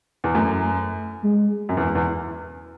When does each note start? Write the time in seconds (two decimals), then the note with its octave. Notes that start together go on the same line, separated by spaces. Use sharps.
0.24 E2
0.35 F#2 A3
1.24 G#3
1.69 F#2
1.77 E2
1.95 E2